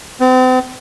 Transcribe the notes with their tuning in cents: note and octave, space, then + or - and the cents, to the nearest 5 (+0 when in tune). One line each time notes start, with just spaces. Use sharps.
C4 -40